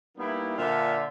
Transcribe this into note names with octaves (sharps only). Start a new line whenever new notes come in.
G3 A#3 B3 D#4 E4
A#2 D3 D4 F4 C5 E5